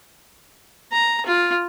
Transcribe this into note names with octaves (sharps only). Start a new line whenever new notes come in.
A#5
F4